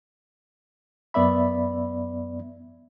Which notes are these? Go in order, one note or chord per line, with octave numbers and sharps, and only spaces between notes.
F#2 B3 D5 E5 B5